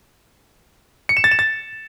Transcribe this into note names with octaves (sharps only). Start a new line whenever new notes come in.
C#7
E7
A6
E7
A6